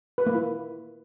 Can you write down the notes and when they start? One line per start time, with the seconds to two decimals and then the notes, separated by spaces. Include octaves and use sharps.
0.18 B4
0.26 A#3
0.35 E4